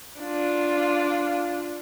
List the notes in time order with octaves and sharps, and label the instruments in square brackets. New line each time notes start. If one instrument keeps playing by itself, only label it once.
[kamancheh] D4 F4